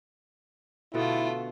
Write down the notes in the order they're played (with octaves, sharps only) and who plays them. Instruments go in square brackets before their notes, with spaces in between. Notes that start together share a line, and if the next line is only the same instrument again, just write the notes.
[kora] B2 D3 [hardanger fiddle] A3 F4 [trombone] E4